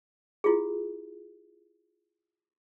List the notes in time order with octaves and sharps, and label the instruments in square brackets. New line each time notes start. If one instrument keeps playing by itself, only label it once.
[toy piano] E4 F4 G4 G#4